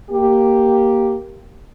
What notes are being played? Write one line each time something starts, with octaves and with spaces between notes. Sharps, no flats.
A#3 G4